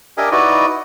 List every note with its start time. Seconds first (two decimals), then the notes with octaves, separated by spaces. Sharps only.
0.17 D4 G4 A#4 D#5 E5 G#5
0.32 D#4 E4 F#4 B4 D5 D#5